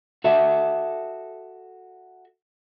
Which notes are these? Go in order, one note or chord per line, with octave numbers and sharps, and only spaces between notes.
F#4 A4 E5